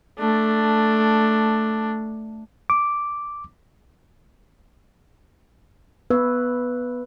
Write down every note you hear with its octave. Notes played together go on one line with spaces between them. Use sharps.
A3 D4
D6
B3 B4